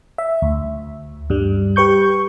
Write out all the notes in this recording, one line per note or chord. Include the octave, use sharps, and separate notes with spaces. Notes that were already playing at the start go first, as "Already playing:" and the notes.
E5
D2
G2 G3
G4 B4 C#6 G6